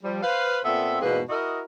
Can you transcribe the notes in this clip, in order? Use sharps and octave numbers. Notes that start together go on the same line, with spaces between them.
F3 G3
B4 C5 F5
A#2 B3 C4 A4 E5
E2 G#2 B2 A#3 G#4 B4
E4 F#4 A#4 D#5